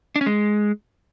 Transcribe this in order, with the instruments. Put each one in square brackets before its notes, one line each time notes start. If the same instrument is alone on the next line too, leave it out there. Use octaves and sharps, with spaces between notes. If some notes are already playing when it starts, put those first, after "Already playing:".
[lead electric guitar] D4
C#4
G#3